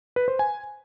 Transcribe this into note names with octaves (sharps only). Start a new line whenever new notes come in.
B4
C5
G#5